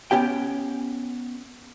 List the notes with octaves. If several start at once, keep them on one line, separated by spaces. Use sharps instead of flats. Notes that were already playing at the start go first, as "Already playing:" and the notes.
B3 C#4 G4 G5